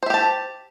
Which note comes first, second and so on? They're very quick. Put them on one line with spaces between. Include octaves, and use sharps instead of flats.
C5 E5 G4 A5